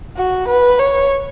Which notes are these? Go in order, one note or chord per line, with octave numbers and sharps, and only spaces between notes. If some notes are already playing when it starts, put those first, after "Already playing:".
F#4
B4
C#5